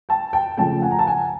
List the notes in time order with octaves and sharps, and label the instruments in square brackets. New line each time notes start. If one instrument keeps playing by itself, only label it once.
[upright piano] G5 A5
G5 A5
C#3 F3 A3 G5 A5
F#5 G#5
A#5
A5
F#5 G#5